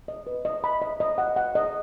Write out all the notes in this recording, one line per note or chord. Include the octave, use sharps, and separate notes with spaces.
D#5
B4
D#5
B5
D#5
D#5
F#5
F#5
D#5